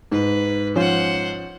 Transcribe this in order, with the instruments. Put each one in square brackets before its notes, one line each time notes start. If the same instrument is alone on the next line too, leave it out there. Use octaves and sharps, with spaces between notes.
[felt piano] G#2 [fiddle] B4
[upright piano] F3 C#4 [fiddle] C5 F#5